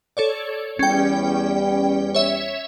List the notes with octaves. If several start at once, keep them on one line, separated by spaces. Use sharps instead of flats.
A4 C#5 D5
E2 G3 C#4 G5
C#5 E5